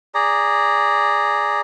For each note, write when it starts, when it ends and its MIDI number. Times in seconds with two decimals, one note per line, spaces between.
0.15 1.61 68
0.15 1.61 74
0.15 1.61 82